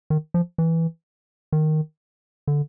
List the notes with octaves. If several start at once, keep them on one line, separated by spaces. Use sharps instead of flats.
D#3
F3
E3
D#3
D3